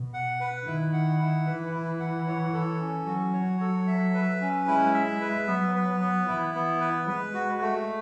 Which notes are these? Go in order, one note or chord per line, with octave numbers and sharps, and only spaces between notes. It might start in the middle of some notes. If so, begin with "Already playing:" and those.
Already playing: B2
F#5
B4
D#3 E4
F#5
E4
E3 B4
E4
F#5
C#5
A4
C#4
F#3 F#4
C#5
A4
E5
B4
C#4
G#3 E4
E5
B4
F#3 B3
B4
B3
E3 E4
B3
B4
G#3 B4
F#4
A3